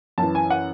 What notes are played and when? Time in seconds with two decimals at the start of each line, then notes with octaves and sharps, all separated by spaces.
0.18 F#2 E3 A5
0.35 G#5
0.50 F#5